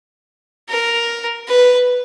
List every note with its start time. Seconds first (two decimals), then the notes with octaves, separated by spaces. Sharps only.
0.69 A#4
1.48 B4